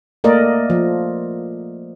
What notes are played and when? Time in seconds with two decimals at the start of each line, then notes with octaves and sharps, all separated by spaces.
0.24 A3 A#3 A#4 D5 D#5
0.70 F3